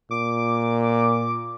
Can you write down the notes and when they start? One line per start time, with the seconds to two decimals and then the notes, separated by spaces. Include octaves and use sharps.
0.11 A#2 D6